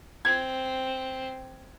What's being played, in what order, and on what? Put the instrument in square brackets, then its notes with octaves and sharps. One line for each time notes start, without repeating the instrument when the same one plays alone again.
[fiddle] C4 [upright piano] G#6